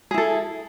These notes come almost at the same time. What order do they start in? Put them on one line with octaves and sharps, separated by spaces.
G#4 E4 A4